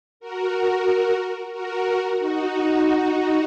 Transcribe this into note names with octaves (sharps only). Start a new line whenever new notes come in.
F#4 A#4
F#4 A#4
D#4 F#4